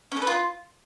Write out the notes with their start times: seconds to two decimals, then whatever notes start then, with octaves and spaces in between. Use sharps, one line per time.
0.12 C#4
0.17 A4
0.22 B4
0.27 F4